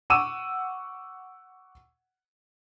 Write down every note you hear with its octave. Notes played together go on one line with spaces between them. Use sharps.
F#5 C#6 D6 E6 D#7 E7